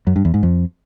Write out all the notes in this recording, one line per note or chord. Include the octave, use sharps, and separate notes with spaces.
F#2
G2
E2
G#2
F2